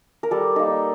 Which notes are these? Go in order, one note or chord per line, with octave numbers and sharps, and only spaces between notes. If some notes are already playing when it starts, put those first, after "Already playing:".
A#4
G3 A4
A#3 D#4